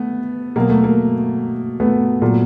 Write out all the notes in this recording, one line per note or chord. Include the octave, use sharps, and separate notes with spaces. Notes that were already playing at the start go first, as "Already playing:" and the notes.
Already playing: A3 B3
B2 F#3 A#3
A3
A#3
A3 B3
A#2 F#3